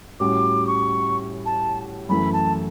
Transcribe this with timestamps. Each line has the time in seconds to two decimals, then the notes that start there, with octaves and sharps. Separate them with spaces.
0.20 A2 G3 C#4 F#4 D6
0.67 C#6
1.46 A5
2.09 F#2 E3 A3 B5
2.33 A5